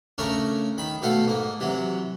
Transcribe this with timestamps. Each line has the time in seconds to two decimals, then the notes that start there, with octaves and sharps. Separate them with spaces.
0.18 C#3 A3 C#4 D4 A#4
0.78 D#3 B5
1.02 B2 A3 A4 F5 F#5
1.26 G#2 A#3
1.60 C3 E3 F#3